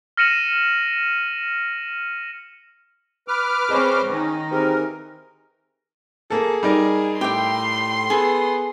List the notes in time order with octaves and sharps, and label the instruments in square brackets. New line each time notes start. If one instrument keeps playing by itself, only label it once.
[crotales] F6 A#6 C#7 D#7 E7 F#7
[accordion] B4 D6 F6
[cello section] C4 C#4 C5 [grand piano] G#4 D#5 G#5
[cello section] D#3 D#4 [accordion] C#4
[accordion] E3 A#4 [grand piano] C4 G4 G#4
[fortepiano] A#3 A4 [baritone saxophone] G#4
[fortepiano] G3 D#4 A#4
[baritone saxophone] A2 [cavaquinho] G4 E5 G5 [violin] C6
[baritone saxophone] B3 [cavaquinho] G#4 A4